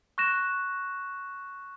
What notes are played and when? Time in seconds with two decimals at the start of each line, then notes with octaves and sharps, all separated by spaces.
0.18 C#6 F#6 A#6 E7